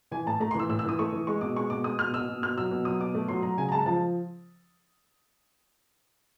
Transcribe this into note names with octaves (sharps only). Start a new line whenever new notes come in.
E3 G#5
A2 A5
A3 A#5
C6
E3 E6
A2 E6
E6
E3 D#6
A3 C#6
E3
G#3 C#6
B2 D6
G#3 C#6
B2 D6
G#3 D#6
B2 F6
B2 E6
B2
B2 F6
F#3 E6
B2
F#3 D#6
B2 D6
A3
F#3 C6
F#3 A#5
C#3 G#5
A#5
G#3 A5
F3 A5